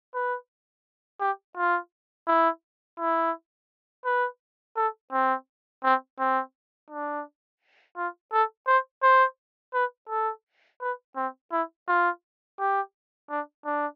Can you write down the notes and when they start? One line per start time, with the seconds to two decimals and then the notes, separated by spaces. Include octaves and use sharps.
0.14 B4
1.20 G4
1.57 F4
2.27 E4
2.99 E4
4.05 B4
4.76 A4
5.13 C4
5.84 C4
6.19 C4
6.90 D4
7.97 F4
8.33 A4
8.67 C5
9.03 C5
9.74 B4
10.09 A4
10.81 B4
11.16 C4
11.51 E4
11.88 F4
12.59 G4
13.30 D4
13.65 D4